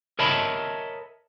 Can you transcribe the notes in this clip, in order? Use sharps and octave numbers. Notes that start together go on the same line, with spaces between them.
A#4 C#5 D#5 E5 A5 B5